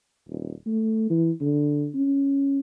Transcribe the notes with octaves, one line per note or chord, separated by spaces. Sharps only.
D#1
A3
E3
D3
C#4